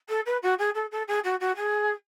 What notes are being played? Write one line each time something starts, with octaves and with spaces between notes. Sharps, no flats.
A4
B4
F#4
G#4
A4
A4
G#4
F#4
F#4
G#4